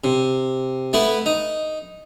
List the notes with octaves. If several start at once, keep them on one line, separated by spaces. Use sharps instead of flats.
C3
A3 B3 E4 B4
D#4